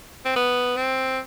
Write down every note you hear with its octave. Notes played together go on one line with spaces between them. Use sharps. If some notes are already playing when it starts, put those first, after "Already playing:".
C4
B3
C4